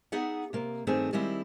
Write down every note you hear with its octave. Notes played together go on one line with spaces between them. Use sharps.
B3 D#4 G#4 E5 F#5
C3 A#3
G2 D#3 A3 C4 G#4
D#3 G3 G#3 C4 E4